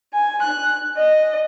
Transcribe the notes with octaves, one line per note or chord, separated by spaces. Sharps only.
G#5
F#6
D#5